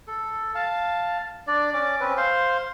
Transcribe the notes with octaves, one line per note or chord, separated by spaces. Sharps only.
A4
F5 A5
D4 D5
C#4 D5 D6
C4 C#4 B4
C5 F5 C6